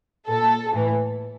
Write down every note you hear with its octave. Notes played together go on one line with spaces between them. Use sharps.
A#2 A4
A2 E3